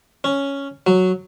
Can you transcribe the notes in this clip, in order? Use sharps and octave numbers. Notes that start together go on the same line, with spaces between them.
C#4
F#3